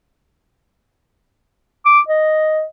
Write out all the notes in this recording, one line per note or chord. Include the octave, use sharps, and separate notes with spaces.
D6
D#5